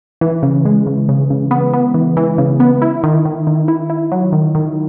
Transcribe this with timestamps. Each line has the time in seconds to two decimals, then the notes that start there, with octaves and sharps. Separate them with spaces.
0.21 E3
0.43 C#3
0.65 G#3
0.87 C#3
1.09 C#3
1.30 C#3
1.51 B3
1.73 B3
1.94 E3
2.17 E3
2.38 C#3
2.60 B3
2.82 E4
3.04 D#3
3.25 D#3
3.47 D#3
3.68 E4
3.90 E4
4.12 F#3
4.33 D#3
4.55 D#3